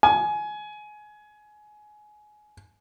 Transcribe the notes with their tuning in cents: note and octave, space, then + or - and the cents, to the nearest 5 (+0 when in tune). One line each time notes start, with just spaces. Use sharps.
G#5 +20